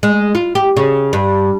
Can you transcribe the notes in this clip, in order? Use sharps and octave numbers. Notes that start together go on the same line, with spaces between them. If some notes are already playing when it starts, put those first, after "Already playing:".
G#3
F4
G4
C#3
G2